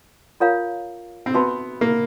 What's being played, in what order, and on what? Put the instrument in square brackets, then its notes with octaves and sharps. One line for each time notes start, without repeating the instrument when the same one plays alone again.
[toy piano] F4 A#4 C#5 F5 A#5
[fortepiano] C4
[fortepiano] B3 [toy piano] F#4 B4 E5 A5 C6
[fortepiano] A#3